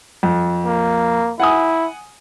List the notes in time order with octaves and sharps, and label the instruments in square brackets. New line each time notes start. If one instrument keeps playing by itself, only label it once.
[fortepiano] F2
[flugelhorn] A#3
[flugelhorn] E4 [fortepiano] F#5 G#5 D#6